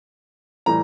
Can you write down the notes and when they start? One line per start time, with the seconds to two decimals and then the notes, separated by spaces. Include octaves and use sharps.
0.66 A2 E3 G3 A#5